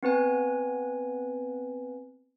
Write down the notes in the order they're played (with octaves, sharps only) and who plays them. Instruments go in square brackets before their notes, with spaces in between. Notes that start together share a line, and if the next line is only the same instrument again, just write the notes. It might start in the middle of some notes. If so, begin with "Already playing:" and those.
[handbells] B3 C4 B4 G#5